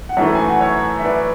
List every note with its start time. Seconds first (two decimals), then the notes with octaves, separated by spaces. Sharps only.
0.09 F#5
0.17 F#2 E3 A3 C#5 E5
0.35 G#5
0.48 F#5
0.61 C#5 E5
0.99 E5
1.05 B4 D5